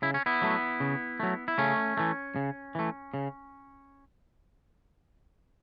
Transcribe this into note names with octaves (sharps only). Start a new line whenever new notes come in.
C#3 E4
C#4
B3 E4
F#3 A3
C#3
F#3 A3
E4
C#3 A3 C#4
E3 A3
C#3
E3 A3
C#3